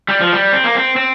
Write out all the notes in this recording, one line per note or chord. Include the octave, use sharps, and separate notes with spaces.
G3
F3
G3
C4
A#3
C4
C4